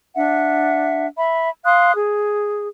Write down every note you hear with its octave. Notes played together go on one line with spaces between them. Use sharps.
D4 E5 F#5
E5 B5
F5 C6 D#6 F#6
G#4